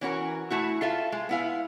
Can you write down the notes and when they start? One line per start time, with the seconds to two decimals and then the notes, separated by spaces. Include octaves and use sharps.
0.01 E3 C#4 F#4 A#4
0.50 A3 E4 F#4
0.81 F4 A4 E5 F5
1.12 G#3
1.29 B3 E4 F5